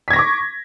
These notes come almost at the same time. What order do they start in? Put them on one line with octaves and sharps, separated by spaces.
B6 G#6 A#6 C#6 D6